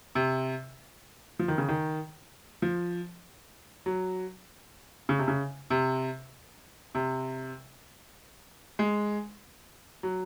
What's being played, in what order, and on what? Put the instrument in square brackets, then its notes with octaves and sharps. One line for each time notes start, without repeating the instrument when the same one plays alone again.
[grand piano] C3
F3
D#3
C#3
D#3
F3
F#3
C#3
C3
C#3
C3
C3
G#3
F#3